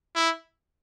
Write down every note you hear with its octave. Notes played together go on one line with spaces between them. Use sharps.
E4